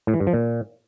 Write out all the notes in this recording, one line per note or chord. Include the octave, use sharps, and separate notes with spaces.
A2
E3
G2
F3
A#2